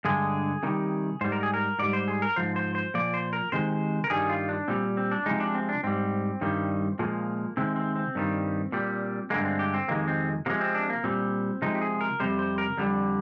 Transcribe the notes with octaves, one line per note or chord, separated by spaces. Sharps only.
G2 D3 G#3 G#4
C3 D#3 G3
G#2 G3 C5
A#4
G#4
A#4
G#2 G3 D5
C5
G#4
A#4
G#2 F3 C5
C5
C5
A#2 F3 D5
C5
A#4
C3 D#3 G#3 C5
A#4
G2 D#3 G3 G#4
F4
D4
A#2 G3 C4
C4
D4
C3 F3 G#3 D#4
D4
C4
D4
G#2 G3 C4
G2 D#3 G3
A#2 F3 G#3 A#3
C3 D#3 G#3 C4
C4
C4
G2 D#3 G3
A#2 G3
G2 D3 G#3 A#3
C4
G4
C4
F2 C3 D#3 G#3 A#3
C4
C3 F3 G#3 A#3
C4
D4
A#3
A#2 G3 C4
C3 F3 G#3 D#4
G4
G#4
A#4
F2 C3 G3 C5
C5
A#4
F2 D3 G3